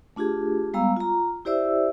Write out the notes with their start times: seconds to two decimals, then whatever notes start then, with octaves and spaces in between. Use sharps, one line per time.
0.16 A3 D4 F4 G4 G#4
0.74 G3 G#3 B3 F5 A#5 E6
0.97 F4 A#5
1.45 E4 G4 C5 D5 E5 E6